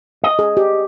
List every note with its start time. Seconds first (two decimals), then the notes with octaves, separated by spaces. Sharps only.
0.24 D#5
0.39 G#4
0.57 G4